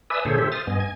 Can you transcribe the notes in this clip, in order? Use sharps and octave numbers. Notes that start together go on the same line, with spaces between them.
B4 D5 E5 G#5 D#6 E6
A#2 D3 G#4 A4 C5 C#5
G4 A4 C5 E5
C5 D#6 F6 A6
G2 B3 D#5 G#5
G#5 G#6